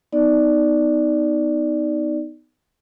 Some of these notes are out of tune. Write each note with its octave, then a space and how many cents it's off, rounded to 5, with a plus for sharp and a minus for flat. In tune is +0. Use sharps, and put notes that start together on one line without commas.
B3 +20 D#4 +0 D5 +0